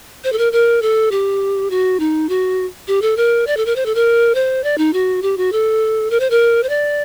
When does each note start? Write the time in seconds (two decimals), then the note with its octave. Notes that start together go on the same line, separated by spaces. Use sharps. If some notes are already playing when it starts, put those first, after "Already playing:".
0.24 C5
0.32 A4
0.38 A#4
0.52 A#4
0.82 A4
1.11 G4
1.70 F#4
2.00 D#4
2.29 F#4
2.88 G4
3.02 A4
3.17 A#4
3.47 D5
3.57 A4
3.66 A#4
3.76 C5
3.86 A4
3.95 A#4
4.35 C5
4.64 D5
4.78 D#4
4.93 F#4
5.22 G4
5.37 F#4
5.52 A4
6.11 A#4
6.20 C5
6.30 A#4
6.63 C5
6.69 D5